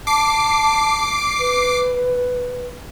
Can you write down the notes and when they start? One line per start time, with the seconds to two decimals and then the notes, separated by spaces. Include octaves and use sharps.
0.07 A5 D6 C7
1.39 B4